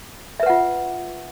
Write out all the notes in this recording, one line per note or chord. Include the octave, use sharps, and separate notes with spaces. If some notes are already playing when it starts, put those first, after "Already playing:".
F4 B4 E5 F#5